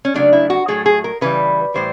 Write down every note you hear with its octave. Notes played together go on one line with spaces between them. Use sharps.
C#4
C#3 F#3 A3 D4
E4
F#4
A2 F#3 A3 G#4
G#4
A#4
C#3 E3 G3 B4
A2 E3 G3 C5